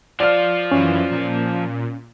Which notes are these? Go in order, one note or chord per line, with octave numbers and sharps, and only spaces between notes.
F3 F4 D5 F6
F#2 E3 C#4
A#2